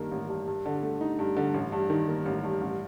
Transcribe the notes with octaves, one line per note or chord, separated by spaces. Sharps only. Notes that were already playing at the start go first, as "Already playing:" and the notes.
Already playing: G2 D#3 A#3
A1
G2
G2
D3
A3
D#4
G2
D3
A1
G2
D#3
A#3
A1
G2
A1